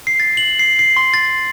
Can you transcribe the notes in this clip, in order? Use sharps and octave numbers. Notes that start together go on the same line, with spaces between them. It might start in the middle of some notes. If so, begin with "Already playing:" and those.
C7
A6
F#7
C7
C7
C6
A6